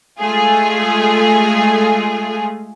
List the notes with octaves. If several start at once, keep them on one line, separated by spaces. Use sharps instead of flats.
G#3 A3 F4 G#4